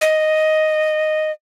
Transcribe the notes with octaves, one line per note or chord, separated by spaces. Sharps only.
D#5